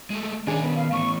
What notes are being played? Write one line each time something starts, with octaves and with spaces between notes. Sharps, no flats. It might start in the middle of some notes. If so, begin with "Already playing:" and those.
G#3 A3
D#3 C#4 D4 G#4 C#5
B3
F5
E3 A3 C#6